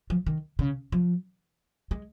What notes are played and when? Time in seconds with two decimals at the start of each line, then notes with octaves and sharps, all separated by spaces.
0.10 F3
0.26 D#3
0.59 C#3
0.92 F3
1.91 G#3